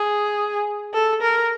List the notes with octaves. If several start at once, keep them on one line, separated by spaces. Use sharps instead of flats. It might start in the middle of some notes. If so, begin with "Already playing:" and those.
Already playing: G#4
A4
A#4